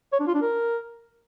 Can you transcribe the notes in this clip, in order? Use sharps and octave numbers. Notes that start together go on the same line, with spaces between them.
C#5
D4
F4
D4
A#4